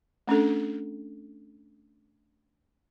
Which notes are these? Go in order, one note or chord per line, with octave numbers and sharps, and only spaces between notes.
A3 C#4 D4 A4